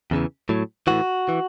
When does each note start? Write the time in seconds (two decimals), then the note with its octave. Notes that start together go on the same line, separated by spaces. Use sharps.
0.11 E2 C#3 E3
0.49 A2 F#3
0.87 A2 E3 F#4
1.29 E3